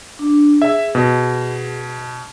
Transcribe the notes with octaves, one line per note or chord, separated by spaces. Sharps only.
D4
G#4 E5
B2